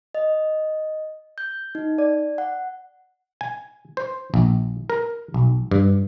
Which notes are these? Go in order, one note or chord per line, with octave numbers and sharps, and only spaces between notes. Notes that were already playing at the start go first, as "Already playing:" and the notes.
D#5
G6
D#4
D5
F#5
G#5
C5
A#1
A#4
B1
G2